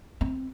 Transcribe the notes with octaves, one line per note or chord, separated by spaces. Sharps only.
C4